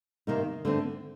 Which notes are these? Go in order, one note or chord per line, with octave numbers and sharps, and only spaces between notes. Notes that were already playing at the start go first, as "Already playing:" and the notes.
C3 D#3 A#3 D#4
D3 A3 C4